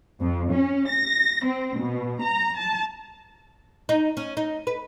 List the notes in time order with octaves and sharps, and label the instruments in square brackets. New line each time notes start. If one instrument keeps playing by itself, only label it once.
[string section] F2
C#4
A#6
C4
B2
A#5
A5
[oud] D#4
C#4
D#4
B4